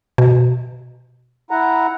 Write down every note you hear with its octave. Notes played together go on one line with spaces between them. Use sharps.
B2
E4 F#5 A#5